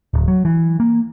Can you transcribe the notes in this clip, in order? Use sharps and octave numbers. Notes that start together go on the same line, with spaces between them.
D1
F#3
E3
A#3